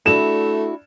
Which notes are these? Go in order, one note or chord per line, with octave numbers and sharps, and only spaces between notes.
A3 D4 E4 F#4 E7